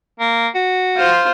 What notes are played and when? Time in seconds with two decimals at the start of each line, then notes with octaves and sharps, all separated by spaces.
0.20 A#3
0.55 F#4
0.97 F4 C5